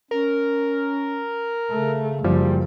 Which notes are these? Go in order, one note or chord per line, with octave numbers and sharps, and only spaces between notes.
C#4 A#4
C#3 A3
F#1 F3 G3